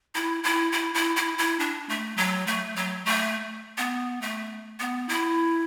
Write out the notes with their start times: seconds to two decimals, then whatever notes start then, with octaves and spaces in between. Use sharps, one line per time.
0.15 E4
0.44 E4
0.72 E4
0.94 E4
1.16 E4
1.38 E4
1.59 D4
1.89 A3
2.17 F#3
2.47 A3
2.76 F#3
3.05 A3
3.78 B3
4.22 A3
4.80 B3
5.09 E4